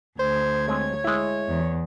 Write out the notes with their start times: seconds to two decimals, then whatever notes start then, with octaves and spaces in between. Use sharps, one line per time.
0.19 D2 C5 G#6
0.68 G#3 C4 G#4 C#5
1.04 G#3 E4
1.48 E2